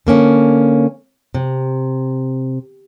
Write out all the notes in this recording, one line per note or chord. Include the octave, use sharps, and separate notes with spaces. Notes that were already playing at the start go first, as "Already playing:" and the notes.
D3 A#3 C#4
C3